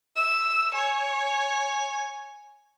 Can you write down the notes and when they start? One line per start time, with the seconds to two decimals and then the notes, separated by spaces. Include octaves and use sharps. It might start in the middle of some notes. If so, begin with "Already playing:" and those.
0.16 E5 E6
0.74 C#5 G#5